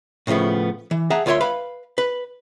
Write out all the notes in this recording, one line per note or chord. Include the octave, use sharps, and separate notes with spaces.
A2 C#3 F3 A3 B3
E3
G#4 E5 F#5 A5 A#5
D2 F4 A#4 C#5 E5 C6
B4 F5 B5
B4